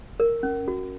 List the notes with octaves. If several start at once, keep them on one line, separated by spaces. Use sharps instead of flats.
A#4
C#4
F#4